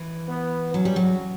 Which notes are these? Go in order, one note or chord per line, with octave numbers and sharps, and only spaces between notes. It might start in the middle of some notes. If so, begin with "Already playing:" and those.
Already playing: E3
B3
F#3 C#4
G3
F#3